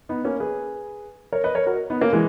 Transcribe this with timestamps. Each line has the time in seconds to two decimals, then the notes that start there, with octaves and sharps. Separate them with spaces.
0.09 B3 D#4
0.25 A#3 C#4
0.40 G#4 B4
1.32 A#4 C#5
1.44 B4 D#5
1.55 A#4 C#5
1.66 F#4 A#4
1.90 B3 D#4
2.01 A#3 C#4
2.13 E3 G#3